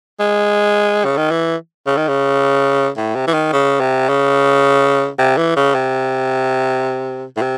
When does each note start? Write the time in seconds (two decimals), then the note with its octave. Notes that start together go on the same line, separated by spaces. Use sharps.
0.20 G#3
1.04 C#3
1.17 D#3
1.31 E3
1.86 C#3
1.97 D#3
2.08 C#3
2.97 A2
3.15 C3
3.27 E3
3.33 D#3
3.53 C#3
3.80 C3
4.08 C#3
5.19 C3
5.37 E3
5.56 C#3
5.74 C3
7.36 A2
7.41 C3